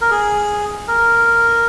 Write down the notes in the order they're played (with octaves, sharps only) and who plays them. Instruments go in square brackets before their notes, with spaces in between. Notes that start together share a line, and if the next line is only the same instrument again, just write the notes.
[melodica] A#4
G#4
A#4